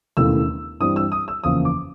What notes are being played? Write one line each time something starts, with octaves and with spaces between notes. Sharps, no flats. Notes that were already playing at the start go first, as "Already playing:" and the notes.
E1 D#2 C#3 E3 A3 E6
G2 E3 G3 C4 D#6
E6
D#6
E6
F#1 E2 C#3 F3 A#3 D#6
D6